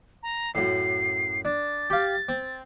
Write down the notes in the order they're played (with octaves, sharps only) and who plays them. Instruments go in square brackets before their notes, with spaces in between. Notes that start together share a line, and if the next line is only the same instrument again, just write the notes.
[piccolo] A#5
[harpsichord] F#2 A2 [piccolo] C7
[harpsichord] D4 [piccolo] A6
[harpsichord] G4 F5
C4